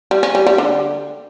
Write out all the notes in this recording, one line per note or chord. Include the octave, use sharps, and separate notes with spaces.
G3
C#4
G3
G3
D3